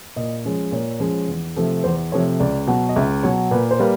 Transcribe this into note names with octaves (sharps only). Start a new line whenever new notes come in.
A#2 D#5
F3 G#3 C#4
A#2 C#5
F3 G#3 C#4
E2
C3 F3 A3
E2 C5
C3 F3 A3 C#5
C#2 D5
B2 F#3
D#5
C#2 E5
B2 F#3 C#5
A#2 B4
C5
G3 A#3 B4